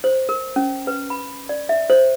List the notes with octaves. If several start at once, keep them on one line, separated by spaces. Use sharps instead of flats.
C5
A#4
C#4
B4
B5
D5
E5
C5